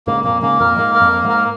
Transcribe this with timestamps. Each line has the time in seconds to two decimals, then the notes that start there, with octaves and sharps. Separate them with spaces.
0.07 G#2 C#3 A#3
0.24 F2 A#2 A#3
0.42 G#2 C#3 A#3
0.60 F2 A#2 A#4
0.78 G#2 A#3
0.95 A#4
1.01 F2
1.12 A#3
1.24 G#2
1.29 A#4